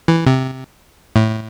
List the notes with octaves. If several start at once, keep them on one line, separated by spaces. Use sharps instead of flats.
E3
C3
A2